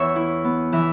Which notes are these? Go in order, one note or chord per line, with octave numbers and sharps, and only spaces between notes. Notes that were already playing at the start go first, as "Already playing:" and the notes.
Already playing: E2 C#5 E5
E4
B3
E3 E5